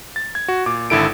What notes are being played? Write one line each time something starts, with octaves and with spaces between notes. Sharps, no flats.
A6
G#6
F#4
A#2 D6
G#1 D3 E4 A4 D7